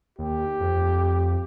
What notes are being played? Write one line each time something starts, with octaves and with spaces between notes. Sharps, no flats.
D#2 G4
F2